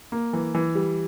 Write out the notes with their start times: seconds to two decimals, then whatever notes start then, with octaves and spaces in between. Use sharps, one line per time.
0.12 A#3
0.33 E3
0.55 E3
0.75 G3